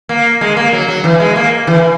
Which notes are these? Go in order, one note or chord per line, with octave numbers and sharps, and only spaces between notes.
A#3
G#3
A#3
F#3
F#3
E3
G#3
A#3
E3